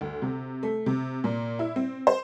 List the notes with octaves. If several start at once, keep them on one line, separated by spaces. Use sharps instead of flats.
D2
C3
A3
C3
A#2
E4
C4
C5